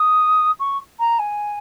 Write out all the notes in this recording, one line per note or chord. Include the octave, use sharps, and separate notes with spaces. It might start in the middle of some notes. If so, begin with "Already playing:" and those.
Already playing: D#6
C#6
A#5
G#5